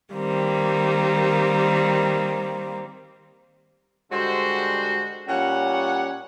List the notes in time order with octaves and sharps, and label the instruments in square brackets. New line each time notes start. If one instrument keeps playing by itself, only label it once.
[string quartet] D#3 G3 A#3 C4
[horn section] D3 G3 G#3 F#4 C5
A#2 G3 C#4 C#5 F#5